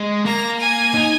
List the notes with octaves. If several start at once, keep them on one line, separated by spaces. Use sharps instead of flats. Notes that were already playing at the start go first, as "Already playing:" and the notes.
Already playing: G#3
A#3 A#5
G#5
D#4